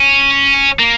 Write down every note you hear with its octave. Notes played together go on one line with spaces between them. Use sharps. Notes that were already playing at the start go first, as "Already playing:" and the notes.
Already playing: C#4
A#3